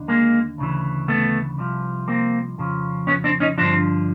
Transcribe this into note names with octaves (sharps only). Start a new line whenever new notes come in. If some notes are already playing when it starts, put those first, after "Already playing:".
Already playing: D#2 D3
G#3 A#3
D2 C#3 E3
A3 B3
C2 C3 F3
A#3 C4
F2 C#3 F3
B3 C#4
C4 D4
C#4 D#4
G2 D3 F3 C4 D4